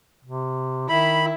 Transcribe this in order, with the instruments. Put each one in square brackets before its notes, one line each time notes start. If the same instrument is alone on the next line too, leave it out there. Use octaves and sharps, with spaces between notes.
[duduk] C3
[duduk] D#3 [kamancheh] E4 [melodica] B5